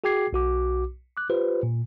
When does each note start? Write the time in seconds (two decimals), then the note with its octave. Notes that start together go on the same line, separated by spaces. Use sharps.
0.04 F#4 G#4 G5 D6 G#6 C7
0.33 B1 F#4 D6
1.17 D6 F#6
1.30 F4 G4 B4 C5
1.63 A#2